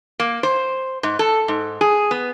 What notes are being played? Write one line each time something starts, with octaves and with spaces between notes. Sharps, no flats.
A#3
C5
G#2
A4
G#2
G#4
B3